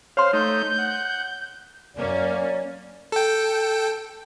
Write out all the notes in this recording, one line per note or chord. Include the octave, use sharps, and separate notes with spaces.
C5 C#5 F5 C6
A3 D#4 G6
F#5
F#2 A#3 C#4 D5
A4 G5